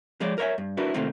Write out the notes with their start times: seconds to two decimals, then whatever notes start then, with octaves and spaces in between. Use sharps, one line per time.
0.20 F3 G#3 G#4 C#5 D5
0.38 A#4 B4 C#5 D#5 E5 G#5
0.58 G2
0.77 D4 E4 F#4 A#4 B4
0.94 C3 D#3 A3 A#3 C4 F4